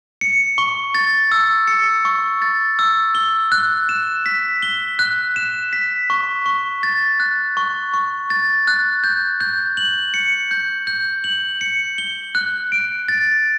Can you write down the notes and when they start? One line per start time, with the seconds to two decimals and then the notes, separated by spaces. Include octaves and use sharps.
0.21 C#7
0.58 C#6
0.95 A6
1.32 E6
1.68 C#7
2.05 C#6
2.42 A6
2.79 E6
3.15 G7
3.52 F#6
3.89 E7
4.26 B6
4.62 G7
4.99 F#6
5.36 E7
5.73 B6
6.10 C#6
6.46 C#6
6.83 A6
7.20 F#6
7.57 C#6
7.94 C#6
8.30 A6
8.67 F#6
9.04 G6
9.41 G6
9.77 F#7
10.14 C#7
10.51 G6
10.87 G6
11.24 F#7
11.61 C#7
11.98 G7
12.35 F#6
12.72 D7
13.08 A6